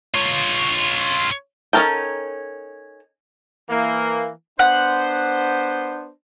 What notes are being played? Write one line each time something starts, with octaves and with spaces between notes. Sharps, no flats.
F4 C#5
C#4 D#4 A4 A#4 G5
E3 A#3
B3 D4 C5 F#5